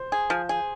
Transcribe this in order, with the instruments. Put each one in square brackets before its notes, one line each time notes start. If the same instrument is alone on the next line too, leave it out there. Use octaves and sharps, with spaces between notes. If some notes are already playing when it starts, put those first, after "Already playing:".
Already playing: [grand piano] C5
[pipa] G#4
F3
G#4